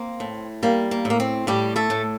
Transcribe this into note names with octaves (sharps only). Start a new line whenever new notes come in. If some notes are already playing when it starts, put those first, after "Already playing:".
Already playing: A#3 C4
A2
G3 A#3
A#3
A2
A#3
C4
A2 G3 G4
A3 A4
A2